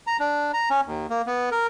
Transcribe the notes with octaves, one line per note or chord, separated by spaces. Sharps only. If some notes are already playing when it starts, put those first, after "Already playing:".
A#5
D4
A#5
C#4
D#2
A#3
B3
A#4